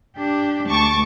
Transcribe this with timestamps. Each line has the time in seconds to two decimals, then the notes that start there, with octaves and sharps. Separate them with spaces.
0.16 D4 G4
0.70 D2 A5 C#6 D6